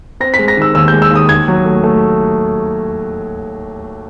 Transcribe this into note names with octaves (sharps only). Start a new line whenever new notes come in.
C4 A#6
B6
G#3
A#6
D#3 E6
D#2 E6
G6
G#3
E6
D#2 D#6
D#2 G#6
F#3
A3
A3